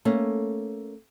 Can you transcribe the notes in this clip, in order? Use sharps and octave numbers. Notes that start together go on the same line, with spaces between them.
A3 A#3 C#4